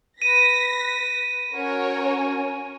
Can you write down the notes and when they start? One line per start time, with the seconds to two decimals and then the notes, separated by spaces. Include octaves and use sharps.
0.22 B4 A#6 B6 D#7
1.54 C#4 F#4 A#4 C#5